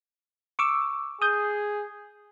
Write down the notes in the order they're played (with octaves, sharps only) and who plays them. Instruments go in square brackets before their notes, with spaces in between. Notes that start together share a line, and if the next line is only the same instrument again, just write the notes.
[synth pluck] C#6 D6 E6
[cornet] G#4 [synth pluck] D#6 G6